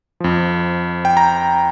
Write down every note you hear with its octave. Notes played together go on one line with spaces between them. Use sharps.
F2 F3
G5
A#5